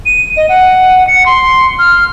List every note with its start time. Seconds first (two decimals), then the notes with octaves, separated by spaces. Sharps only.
0.06 D#7
0.37 D#5
0.49 F#5
1.07 C#7
1.26 C6
1.79 F6